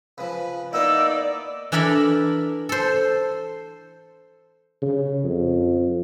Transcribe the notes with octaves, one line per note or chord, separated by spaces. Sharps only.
C#3 F3 B4
A#3 B3 D#4 E4 D5 E6
E3 D4 A4 A#4 E5 B5
A4 C5
C#3
F2